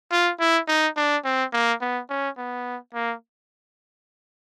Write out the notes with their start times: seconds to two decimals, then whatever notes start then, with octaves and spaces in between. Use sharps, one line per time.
0.12 F4
0.40 E4
0.68 D#4
0.97 D4
1.25 C4
1.53 A#3
1.81 B3
2.10 C#4
2.37 B3
2.94 A#3